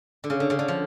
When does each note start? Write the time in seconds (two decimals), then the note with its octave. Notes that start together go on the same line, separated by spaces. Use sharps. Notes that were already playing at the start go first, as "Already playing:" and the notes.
0.24 D3
0.30 C#3
0.40 D3
0.50 C#3
0.59 D3
0.68 F3